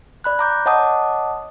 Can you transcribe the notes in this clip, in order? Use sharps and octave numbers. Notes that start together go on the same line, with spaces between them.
D5 B5 F#6
A#5 D6 G6
C#5 D#5 F#5 A5 D6 D#6